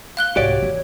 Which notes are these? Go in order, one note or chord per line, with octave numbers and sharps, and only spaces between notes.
F5 F#6 G7
C2 G#2 F#4 G4 C#5 D5
D#3 E3